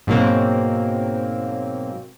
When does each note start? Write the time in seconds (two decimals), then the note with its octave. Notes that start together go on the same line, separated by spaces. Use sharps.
0.07 G#2 B2 F#3 A#3 C4